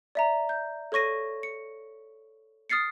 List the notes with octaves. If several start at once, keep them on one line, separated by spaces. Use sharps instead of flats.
D5 E5 A#5
G6
A4 C#5 C#6 A#6 D#7
C#7
D#6 F6 A6 C7 C#7